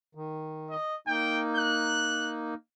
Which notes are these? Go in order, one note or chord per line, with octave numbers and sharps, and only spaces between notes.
D#3
D#5
A#3 D#4 G5
F#6